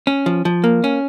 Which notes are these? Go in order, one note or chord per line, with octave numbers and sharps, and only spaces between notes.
C#4
F3
F3
A#3
C#4